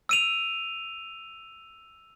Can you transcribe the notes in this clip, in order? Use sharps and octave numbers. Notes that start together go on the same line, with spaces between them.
E6 D#7 F7